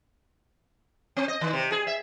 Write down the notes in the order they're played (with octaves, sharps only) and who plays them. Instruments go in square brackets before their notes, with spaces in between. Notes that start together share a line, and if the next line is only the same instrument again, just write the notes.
[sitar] C4
D#5
D#3
C3
G#4
E5